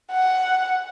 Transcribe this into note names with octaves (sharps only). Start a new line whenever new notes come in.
F#5